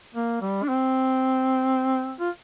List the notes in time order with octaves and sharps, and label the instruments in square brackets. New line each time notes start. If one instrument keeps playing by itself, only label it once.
[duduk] A#3
G3
D4
C4
F4